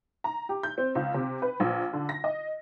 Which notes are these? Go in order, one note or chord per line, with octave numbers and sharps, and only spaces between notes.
A#5
G4
G6
C4
C#2
C3
B4
A#1
D3
A#6
D#5